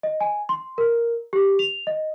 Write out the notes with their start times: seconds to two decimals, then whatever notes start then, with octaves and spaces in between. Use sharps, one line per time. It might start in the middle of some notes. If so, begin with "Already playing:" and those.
0.03 D#5
0.21 G#5
0.49 C6
0.78 A#4
1.33 G4
1.59 F7
1.87 D#5